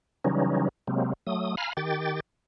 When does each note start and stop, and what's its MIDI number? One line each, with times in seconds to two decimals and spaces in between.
0.24 0.68 49
0.24 0.68 52
0.24 0.68 54
0.24 0.68 55
0.24 0.68 61
0.24 0.68 63
0.87 1.13 48
0.87 1.13 54
0.87 1.13 56
0.87 1.13 58
0.87 1.13 60
1.27 1.55 54
1.27 1.55 57
1.27 1.55 87
1.57 1.73 77
1.57 1.73 80
1.57 1.73 82
1.57 1.73 83
1.57 1.73 89
1.77 2.20 51
1.77 2.20 67
1.77 2.20 79
1.77 2.20 93